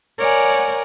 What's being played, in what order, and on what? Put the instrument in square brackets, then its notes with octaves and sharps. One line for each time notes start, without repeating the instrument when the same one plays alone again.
[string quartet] A#4 C#5 D5 F#5 G#5